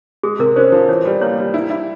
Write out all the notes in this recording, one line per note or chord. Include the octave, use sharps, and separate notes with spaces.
G#3 G#4
C3 A#4
C#4 C5
F3
E3 C#5
G3
A#3 C#5
G3
E4
E4